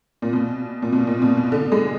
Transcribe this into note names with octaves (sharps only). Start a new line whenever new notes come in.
A#2
B2
A#2
B2
A#2
B2
B2
D3
G#3